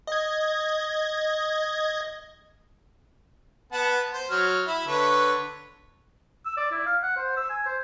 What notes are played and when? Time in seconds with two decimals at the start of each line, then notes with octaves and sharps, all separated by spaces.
0.07 D#5 G#6
3.72 B3 F#5 A5
4.13 C5
4.31 F#3 F6
4.67 E4
4.88 D3 B4 C#5
6.45 E6
6.57 D5
6.71 E4
6.86 F5
7.03 F#5
7.16 C5
7.37 E6
7.50 G#5
7.66 C5